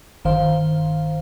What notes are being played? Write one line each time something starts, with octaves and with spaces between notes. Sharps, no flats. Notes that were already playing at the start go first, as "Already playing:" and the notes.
G1 D#3 C5 F5